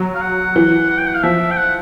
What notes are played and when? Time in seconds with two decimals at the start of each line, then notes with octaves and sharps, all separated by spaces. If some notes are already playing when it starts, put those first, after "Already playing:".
Already playing: F#3
0.15 F5
0.22 F#5
0.56 E3
0.90 F#5
0.98 G5
1.07 F#5
1.15 F5
1.23 F3 E5
1.51 G5
1.57 F#5